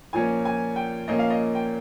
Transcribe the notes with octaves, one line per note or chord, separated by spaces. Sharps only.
A#2 F3 A#3 C#4 G#5
G#5
G5
A#2 F3 A#3 C#4 D#5
F5
D#5
G5